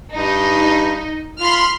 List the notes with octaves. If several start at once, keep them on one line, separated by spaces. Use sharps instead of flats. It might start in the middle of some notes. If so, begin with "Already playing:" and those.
G2 D#4
F4 B5 C6 F6